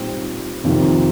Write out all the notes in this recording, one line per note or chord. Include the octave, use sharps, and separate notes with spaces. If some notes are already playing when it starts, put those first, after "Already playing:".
Already playing: A#2 G3 C4 D#4
F2 C3 D#3 A#3 F4